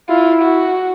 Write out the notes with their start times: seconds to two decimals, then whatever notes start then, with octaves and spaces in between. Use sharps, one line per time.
0.09 E4 F4
0.43 F#4